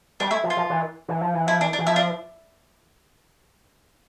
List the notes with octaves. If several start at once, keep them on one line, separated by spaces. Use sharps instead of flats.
G3 D4
A3 E4
F3
F4
F3
E3
E3
F3
E3
F3 E4
E3 D4
D4
E3
F3 E4
D4